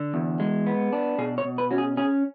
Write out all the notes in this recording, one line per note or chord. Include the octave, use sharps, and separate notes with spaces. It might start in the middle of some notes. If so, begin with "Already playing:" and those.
Already playing: D3
E2
G#3
B3
D4
B2 G#4
C#5
B2
B4
C#4 F#4
G#4
C#4 G#4